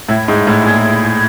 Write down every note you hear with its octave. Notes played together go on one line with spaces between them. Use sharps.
A2 E4
G#2 E4
A2 E4
A#2 G#4
E4
G#4